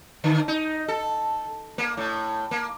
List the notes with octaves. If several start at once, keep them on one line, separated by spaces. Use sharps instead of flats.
D3
D#4
A4
A#3
A2
A#3